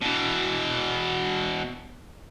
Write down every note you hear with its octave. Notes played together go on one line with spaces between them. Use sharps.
B2 E3